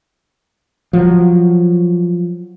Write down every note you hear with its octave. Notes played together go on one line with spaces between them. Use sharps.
F3 F#3